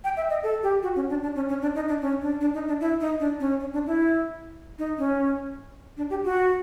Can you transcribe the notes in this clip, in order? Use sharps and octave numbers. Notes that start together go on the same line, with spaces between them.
G5
E5
D#5
A4
G4
F#4
C#4
D4
D4
C#4
C#4
D4
D#4
D4
C#4
D4
D4
D#4
D4
E4
D#4
D4
C#4
C#4
D4
E4
D#4
C#4
D4
G4
F#4